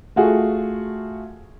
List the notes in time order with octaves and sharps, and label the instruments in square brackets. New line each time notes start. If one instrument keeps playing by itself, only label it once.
[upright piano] A3 F4 F#4 G#4